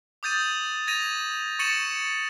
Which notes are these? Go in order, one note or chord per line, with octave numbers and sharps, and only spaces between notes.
D6 D#6 G6 A6 D#7
G#6 A#6 D#7 F7
C#6 A6 C#7 D#7 E7 F#7